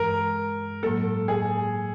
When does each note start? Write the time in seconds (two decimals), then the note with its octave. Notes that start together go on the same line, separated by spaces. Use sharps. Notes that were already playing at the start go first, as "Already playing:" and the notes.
Already playing: G2 E3 G#3 A#4
0.83 A2 F#3 A#3 A4
1.28 G#4